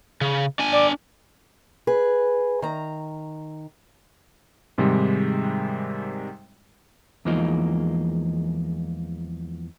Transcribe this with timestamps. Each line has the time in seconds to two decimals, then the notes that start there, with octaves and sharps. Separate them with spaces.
0.21 C#3
0.59 D4 G#5
0.72 D5
1.87 G#4 B4
2.62 D#3 A#5
4.78 G#2 C3 D#3 G3 G#3
7.25 E2 E3 F3 G#3 A#3 D#4